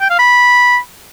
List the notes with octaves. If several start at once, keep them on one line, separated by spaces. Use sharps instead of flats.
G5
F5
B5